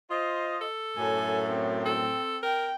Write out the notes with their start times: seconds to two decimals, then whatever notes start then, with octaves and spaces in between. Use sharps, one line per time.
0.10 F4 C5 D#5
0.61 A4
0.97 F#2 A2 G#5
1.50 C4
1.86 A4
2.43 A#4 G5